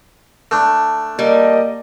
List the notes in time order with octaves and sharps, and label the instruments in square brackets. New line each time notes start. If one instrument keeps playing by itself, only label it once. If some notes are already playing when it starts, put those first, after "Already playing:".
[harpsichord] A3 D4
[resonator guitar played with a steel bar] G3 [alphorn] A#3 [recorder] D#5